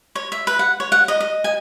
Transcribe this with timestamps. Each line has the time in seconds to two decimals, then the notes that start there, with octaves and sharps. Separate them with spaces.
0.15 C#5
0.32 E5
0.47 B4
0.59 F#5
0.80 C#5
0.92 F#5
1.08 D#5
1.21 D#5
1.44 G#5